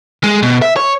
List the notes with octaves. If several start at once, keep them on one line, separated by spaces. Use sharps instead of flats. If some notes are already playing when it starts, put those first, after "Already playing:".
G#3
B2
E5
C#5